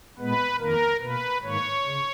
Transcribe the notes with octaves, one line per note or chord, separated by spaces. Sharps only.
A#2 G#3 B3 B4
F2 D#3 A#3 A#4
B2 B4
A#3
G#2 D#3 A#3 C#5
C#3